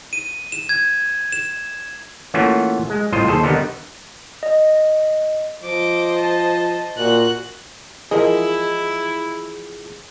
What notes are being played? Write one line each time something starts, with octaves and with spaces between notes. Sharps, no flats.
D#7
E7
G#6
E7
E3 A3 A#3 C#4 F4 F#4
G#3
C2 A2 F4 C5 D#5
D#2 G#4 A4 C5
D3 D#3 G3 B3 D#4
D#5
F3 C5 D#5 D6
A5
A#2 F#4 F#6
E3 F3 G#3 E4 G#4 A#4 D#5